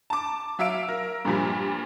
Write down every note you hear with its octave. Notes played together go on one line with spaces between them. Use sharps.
A5 D6
F#3 E5 F5 E6 D7
A#4
G2 A#2 F3 G3